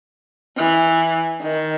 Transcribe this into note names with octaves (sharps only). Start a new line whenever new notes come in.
E3
D#3